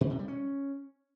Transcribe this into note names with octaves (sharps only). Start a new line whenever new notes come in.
A#2
C3
G3
C#4